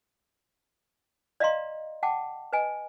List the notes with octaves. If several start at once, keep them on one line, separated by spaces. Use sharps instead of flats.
D5 D#5 F5 A#5 C6
F#5 G5 A5 D6
B4 D#5 G#5